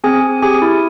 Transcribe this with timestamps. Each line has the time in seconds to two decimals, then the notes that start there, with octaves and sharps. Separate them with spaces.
0.04 C4 G#4 G#5
0.24 C4
0.42 G4 G#4 G#5
0.62 E4